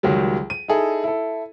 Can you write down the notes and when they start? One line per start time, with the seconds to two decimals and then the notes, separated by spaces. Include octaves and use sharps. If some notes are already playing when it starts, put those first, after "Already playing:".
0.03 C#2 D#3 F#3 G3
0.50 D#7
0.68 D#4 E4 G#4 A4
1.04 E4 A4